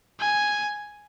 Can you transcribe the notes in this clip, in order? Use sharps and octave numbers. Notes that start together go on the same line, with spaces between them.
G#5